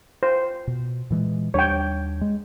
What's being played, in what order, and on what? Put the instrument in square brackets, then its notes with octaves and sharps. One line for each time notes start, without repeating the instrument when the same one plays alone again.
[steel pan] C5
[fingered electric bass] B2
A#2 E3 G#3
[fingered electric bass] D#2 G3 D4 [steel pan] C#5 G5
[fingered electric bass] G#3